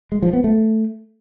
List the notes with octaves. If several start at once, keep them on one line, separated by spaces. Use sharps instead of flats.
G#3
F3
B3
A3